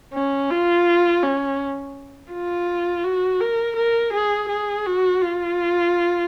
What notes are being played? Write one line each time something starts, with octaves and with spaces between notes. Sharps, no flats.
C#4
F4
C#4
F4
F#4
A#4
A#4
G#4
G#4
F#4
F4